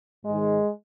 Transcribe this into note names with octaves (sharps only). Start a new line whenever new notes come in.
G#2 D#3 G#3